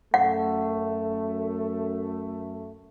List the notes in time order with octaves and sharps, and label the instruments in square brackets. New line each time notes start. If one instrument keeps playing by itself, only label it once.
[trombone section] F#2 A3 [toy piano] F#5